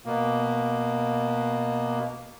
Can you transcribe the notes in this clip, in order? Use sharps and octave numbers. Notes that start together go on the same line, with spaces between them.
B2 A#3